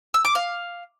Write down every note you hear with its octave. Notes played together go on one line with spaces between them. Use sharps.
E6
D6
F5